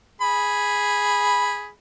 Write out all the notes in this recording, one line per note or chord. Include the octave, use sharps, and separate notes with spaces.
G#4 B5